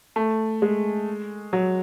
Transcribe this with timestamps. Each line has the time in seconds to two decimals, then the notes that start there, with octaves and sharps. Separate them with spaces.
0.16 A3
0.62 G#3
1.53 F#3